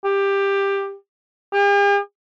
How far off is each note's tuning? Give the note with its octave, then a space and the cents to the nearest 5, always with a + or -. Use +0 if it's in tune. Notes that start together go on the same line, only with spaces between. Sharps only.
G4 +15
G4 +45